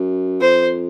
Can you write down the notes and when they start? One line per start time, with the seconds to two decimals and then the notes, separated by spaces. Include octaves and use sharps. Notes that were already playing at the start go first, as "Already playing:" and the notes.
Already playing: F#2
0.41 F2 C5